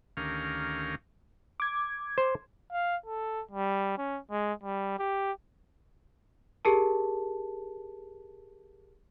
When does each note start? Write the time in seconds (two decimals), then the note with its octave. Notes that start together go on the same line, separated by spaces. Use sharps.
0.17 D2 D#3 C#4 G4 A#4 F5
1.60 D6 G#6
2.18 C5
2.72 F5
3.06 A4
3.52 G3
3.98 C#4
4.31 G#3
4.64 G3
4.99 G4
6.65 G4 G#4 A#4 A5